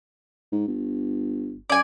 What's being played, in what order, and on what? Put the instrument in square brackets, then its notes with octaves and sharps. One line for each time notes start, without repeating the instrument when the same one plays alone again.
[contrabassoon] G#2
G1
[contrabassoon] F#2 [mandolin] D5 G#5